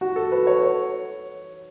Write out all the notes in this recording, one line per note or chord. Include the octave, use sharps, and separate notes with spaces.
F#4
A4
B4
C#5
C#5